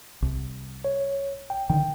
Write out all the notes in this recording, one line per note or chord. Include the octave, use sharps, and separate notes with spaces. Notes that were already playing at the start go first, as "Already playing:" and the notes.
C2
C#5
G5
D3 D#3 G5